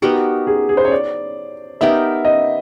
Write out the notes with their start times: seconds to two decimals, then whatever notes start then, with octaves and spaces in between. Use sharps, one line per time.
0.02 B3 D#4 F#4 G4 A#4
0.47 G#4
0.69 G#4
0.77 C5
0.85 C#5
0.91 D5
1.81 B3 D#4 G4 A#4 E5
2.25 D#5